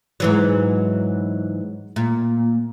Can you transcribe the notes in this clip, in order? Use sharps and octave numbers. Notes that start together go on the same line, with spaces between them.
G#2 E3 F#3
A#2